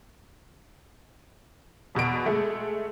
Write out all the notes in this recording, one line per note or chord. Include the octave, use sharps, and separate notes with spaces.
E2 B2 F#4 D7
G#3 A3